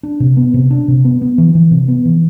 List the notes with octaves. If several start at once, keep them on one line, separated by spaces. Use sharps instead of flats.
D4
C3
B3
C3
D4
C3
B3
B3
E3
E3
C3
B3
E3